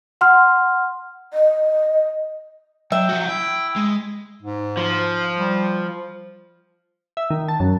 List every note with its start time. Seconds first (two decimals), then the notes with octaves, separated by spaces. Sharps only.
0.21 F#5 C6 F6
1.34 D#5
2.92 F#3 E5 G5
3.09 F3 F#4
3.29 E4 G5
3.76 G#3
4.43 G#2
4.77 F3
5.38 G3
7.17 E5
7.30 D#3
7.48 A5
7.60 F#2